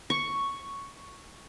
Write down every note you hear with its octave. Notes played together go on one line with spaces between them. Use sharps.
C#6